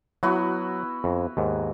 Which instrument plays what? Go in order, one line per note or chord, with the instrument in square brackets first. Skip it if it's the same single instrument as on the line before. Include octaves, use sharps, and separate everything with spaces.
[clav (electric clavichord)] F#3 [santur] B3 E4 F#4
[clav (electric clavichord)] F2
D#2 G#2